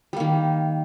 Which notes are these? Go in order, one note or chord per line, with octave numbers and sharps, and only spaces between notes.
D#3 G3 A#3